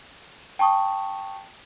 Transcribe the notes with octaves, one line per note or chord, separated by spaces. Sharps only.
G5 A5 C#6 D#6